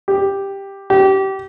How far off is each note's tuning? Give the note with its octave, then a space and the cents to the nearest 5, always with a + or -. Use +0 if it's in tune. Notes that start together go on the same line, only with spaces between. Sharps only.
G4 +5
G4 -25